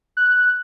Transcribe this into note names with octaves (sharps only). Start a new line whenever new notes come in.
F#6